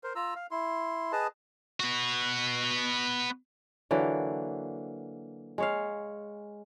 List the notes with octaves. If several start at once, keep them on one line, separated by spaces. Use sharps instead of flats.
A#4 C5
F4 A#5 E6
F5
E4 C6
G#4 B4 D#5 A5
B3 F#4
D3 E3 F#3 A#3
G#3 C#5 F5